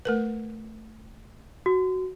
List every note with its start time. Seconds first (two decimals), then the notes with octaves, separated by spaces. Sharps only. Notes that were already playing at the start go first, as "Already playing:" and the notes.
0.05 A3 A#4 B4
1.66 F#4